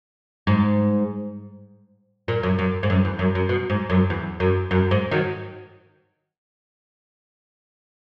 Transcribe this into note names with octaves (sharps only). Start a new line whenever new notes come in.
G#2
A#2
F#2
F#2
G#2
F#2
E2
F#2
F#2
B2
G#2
F#2
E2
F#2
F#2
G#2
D#3 F#3